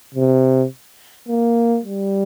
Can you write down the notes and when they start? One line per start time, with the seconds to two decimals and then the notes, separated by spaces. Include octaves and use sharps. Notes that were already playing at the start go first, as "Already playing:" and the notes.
0.14 C3
1.28 A#3
1.85 G3